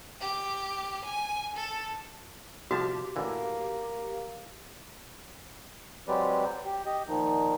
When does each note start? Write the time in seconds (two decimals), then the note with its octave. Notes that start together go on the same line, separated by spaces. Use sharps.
0.20 G4
1.04 G#5
1.56 A4
2.71 C2 F3 F#4 G4 A5
3.16 A1 D3 E3 A#3
6.08 F#3 G#3 C4 G4 B4 D5
6.65 G4
6.86 G4 D#5
7.08 A#2 D#3 F3 D#4